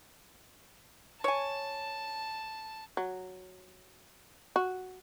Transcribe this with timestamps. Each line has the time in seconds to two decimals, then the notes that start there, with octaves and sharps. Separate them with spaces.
1.24 C#5 G#5 A5
2.97 F#3
4.56 F#4